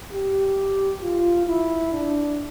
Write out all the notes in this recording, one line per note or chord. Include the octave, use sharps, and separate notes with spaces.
G4
F4
E4
D4